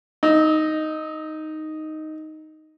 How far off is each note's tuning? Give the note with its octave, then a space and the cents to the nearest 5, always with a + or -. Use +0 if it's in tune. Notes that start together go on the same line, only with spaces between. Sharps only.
D#4 +0 E6 -35